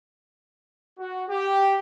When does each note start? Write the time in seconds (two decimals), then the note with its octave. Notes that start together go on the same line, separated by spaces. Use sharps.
0.99 F#4
1.29 G4